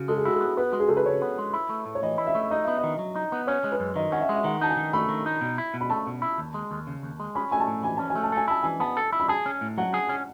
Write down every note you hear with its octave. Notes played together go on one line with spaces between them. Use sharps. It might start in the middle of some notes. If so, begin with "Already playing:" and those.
Already playing: C#3 F#4
G#3 A4
G#4
E4 F#4
G#4
B3
B3 B4
G#3 F#4
G#4
C#2 A4
B4
C#3 C#5
B3
G#3
E4
A3
A2
C#5
E3 D#5
E4
E5
A3
D#4 D#5
B3 E5
D#5
D#3
F#3
D#4
B3
C#4 C#5
G#3
B4
F#2
D#3 D#5
C#4 F#5
E5
G#3
E5
D#3 F#5
D#4 A5
G#5
D#3
A3 B5
D#3
D#4
B2
E4
B2
B5
A3 A5
B2
E4
D#2
G#3
D#2
C#3
D#2
G#3
C#4 B5
A3 G#5
A5
A2
E3 G#5
C#4 A5
G#5
A3
A5
A4 G#5
E4 A5
E3 G#5
B3 A5
A4
E4
B5
G#4 A5
C#4
A2
F#3 F#5
G#4
C#4